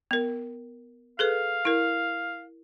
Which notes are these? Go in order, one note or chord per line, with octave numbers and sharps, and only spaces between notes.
B3 A#4
G#4 A4 B4 F5
E4 A#4